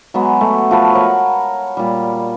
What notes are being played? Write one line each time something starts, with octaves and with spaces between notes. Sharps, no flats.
F#3 G#3 B3
A3
F3 A3 B4
A#4 C#5 F#5
A#2 G3